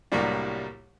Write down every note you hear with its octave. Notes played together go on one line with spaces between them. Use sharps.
C2 A2 F#3 G3 A#3 D4